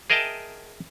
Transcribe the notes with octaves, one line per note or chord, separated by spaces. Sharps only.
G#4 A#4 D#5 E5 G5 A5